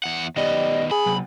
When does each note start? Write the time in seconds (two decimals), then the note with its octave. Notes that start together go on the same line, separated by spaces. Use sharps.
0.04 E2 F#5
0.36 D#3 G3 B3 D#5
0.91 G#4 B5
1.06 C3 F#3